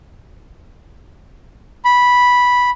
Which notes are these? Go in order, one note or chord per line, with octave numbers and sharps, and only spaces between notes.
B5